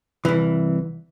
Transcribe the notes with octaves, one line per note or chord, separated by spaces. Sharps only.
C2 E3